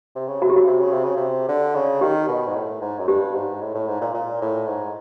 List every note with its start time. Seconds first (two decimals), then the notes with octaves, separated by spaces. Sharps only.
0.15 C3
0.28 C#3
0.41 C3 F#4
0.50 G4
0.53 C#3 F#4
0.66 C3
0.80 C#3
0.92 C3
1.04 C#3
1.17 C3
1.49 D3
1.75 C#3
2.01 D#3 G4
2.28 B2
2.47 G#2
2.55 A2
2.82 G#2
2.99 F#2
3.08 G2 G4
3.34 G#2
3.62 A2
3.75 A2
3.88 G#2
4.01 A#2
4.14 A#2
4.41 A2
4.67 G#2